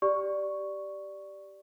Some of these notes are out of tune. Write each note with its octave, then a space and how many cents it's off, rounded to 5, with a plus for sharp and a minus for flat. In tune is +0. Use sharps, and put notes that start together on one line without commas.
G4 -10 D5 +0 C#6 +0